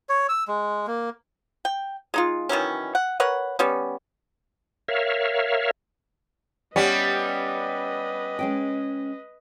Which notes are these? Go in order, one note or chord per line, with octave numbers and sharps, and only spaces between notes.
C#5
E6
G#3
A#3
G5
G#3 D#4 F4
D#3 E3 F#3 C#4
F#5
A#4 B4 C#5 F#5
G3 B3 C#4
A#4 C#5 E5 F5
G3 B3 C#4 G4 B4 D5 D#5
G#3 C#4 G5